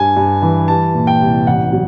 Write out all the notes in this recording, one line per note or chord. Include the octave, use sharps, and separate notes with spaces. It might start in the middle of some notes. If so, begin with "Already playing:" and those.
Already playing: G2 G#5
G2
E3
G3 A5
A#2
G5
C2
A1 F#5
F#3